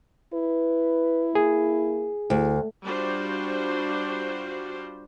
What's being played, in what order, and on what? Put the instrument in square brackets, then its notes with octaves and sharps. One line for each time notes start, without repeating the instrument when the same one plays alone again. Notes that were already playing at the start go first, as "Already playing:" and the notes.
[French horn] E4 [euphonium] B4
[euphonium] A#3 [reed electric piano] G#4
[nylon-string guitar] D2 [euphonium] E4
[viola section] G3 D4 F4 F#4 C5